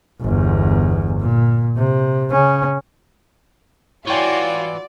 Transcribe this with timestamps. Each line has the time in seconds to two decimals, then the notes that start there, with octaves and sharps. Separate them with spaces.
0.21 G1 E2
1.19 A#2
1.77 C3
2.31 C#3 C#4
4.07 E3 F4 F#4 C#5 D5 G5 G#5